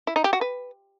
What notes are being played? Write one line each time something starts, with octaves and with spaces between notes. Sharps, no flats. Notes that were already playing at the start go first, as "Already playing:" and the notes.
E4
D#4
G4
F#4
B4